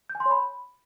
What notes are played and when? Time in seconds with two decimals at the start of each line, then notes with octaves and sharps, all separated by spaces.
0.10 G6
0.15 G#5
0.20 C6
0.26 C#5
0.31 B5